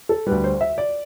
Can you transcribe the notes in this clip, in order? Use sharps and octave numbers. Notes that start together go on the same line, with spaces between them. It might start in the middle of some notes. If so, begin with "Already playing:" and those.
A4
D2 D3 G3 B4
C5
E5
D5